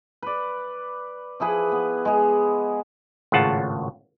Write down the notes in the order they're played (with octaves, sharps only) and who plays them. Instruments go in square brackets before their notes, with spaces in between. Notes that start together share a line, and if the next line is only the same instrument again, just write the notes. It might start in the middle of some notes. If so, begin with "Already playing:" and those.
[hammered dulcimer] B4 D5
F3 E4 G#4 B4
B3
G#3 G#4
[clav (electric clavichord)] G#1 A2 C#3 F4 F#5 A5